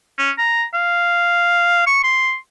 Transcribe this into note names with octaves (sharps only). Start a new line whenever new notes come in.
C#4
A#5
F5
C#6
C6